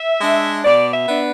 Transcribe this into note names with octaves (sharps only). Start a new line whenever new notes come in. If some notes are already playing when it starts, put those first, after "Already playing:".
Already playing: E5
G#3 D4
B2 D5
E5
B3 D4